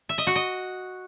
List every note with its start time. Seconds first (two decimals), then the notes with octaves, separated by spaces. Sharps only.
0.09 E5
0.18 D#5
0.27 F#4
0.36 D#5